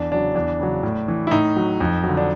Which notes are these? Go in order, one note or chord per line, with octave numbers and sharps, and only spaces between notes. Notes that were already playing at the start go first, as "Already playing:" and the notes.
Already playing: E2 D4
C#3 F#3 D4
E2 D4
C#3 F#3
A2
E3
E4
A2 D#4
F#3
F2
F#3
D3
D4